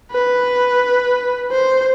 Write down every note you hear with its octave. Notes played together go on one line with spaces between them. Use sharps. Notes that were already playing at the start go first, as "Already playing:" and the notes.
B4
C5